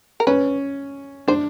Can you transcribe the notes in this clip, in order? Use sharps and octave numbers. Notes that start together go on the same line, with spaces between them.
A#4
C#4 B4
D4 C5